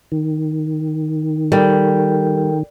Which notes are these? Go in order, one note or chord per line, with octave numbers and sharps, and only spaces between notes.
D#3
G3 A4 A#4 G5